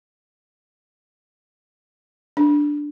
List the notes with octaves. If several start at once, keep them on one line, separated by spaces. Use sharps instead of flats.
D4